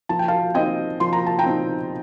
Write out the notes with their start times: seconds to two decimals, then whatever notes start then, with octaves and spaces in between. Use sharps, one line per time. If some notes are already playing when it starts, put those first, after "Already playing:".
0.09 F3 A5
0.19 G5
0.28 F5 A5
0.54 C4 D#4 D#5 G5
1.00 F3 C6
1.13 A#5
1.27 A5
1.39 G5 A#5
1.46 C4 D#4